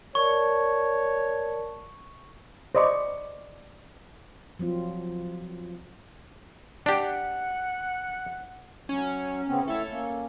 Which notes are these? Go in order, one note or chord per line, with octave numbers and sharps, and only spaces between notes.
A#4 C#5 D5 A5 C#6
C5 D5 D#5 B5 C#6
F3 F#3 C4 F4
D4 G4 F#5
F#3 C#4
C#3 B3 C4
A3 E4 A4 C#5 E5
A#3 C#4